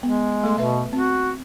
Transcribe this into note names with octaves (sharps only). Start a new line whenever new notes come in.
G#3 B3
A3 A4 C6
B2 B4 E5
C4 F#4